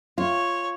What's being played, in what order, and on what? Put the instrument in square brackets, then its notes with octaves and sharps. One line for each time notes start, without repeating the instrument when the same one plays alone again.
[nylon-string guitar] F4 [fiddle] C#5